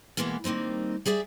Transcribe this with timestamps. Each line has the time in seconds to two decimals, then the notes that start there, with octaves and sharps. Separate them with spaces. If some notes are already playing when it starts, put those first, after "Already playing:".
0.17 B2 E3 G#3 A#3 B3
0.44 D#3 G3 A#3 C4 D#4
1.06 G3 G#4 D5 E5